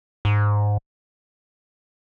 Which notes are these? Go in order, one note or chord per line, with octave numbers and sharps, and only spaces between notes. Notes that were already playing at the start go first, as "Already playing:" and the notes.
G#2